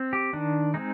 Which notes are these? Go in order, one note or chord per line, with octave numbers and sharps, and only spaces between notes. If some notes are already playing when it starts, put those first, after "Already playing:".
Already playing: C4
G4
D#3 D4
G#3 C4 D#4